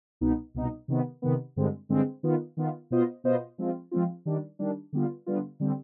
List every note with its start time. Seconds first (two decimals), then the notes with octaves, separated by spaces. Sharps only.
0.21 C2 B2 B3 D#4
0.55 C2 B2 B3 D#4
0.88 C3 D#3 B3
1.22 C3 D#3 B3
1.56 G2 D3 G#3 C4
1.89 G2 D3 G#3 C4
2.23 D#3 B3 F4
2.57 D#3 B3 F4
2.90 B2 B3 F4 C5 D#5
3.24 B2 B3 F4 C5 D#5
3.58 F3 G#3 C4 F4
3.91 F3 G#3 C4 F4
4.25 D#3 G3 D4
4.59 D#3 G3 D4
4.93 D3 G3 B3 F4
5.26 D3 G3 B3 F4
5.60 D3 G3 C4